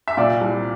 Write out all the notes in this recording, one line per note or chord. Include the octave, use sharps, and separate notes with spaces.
E5
A#2 D5
C2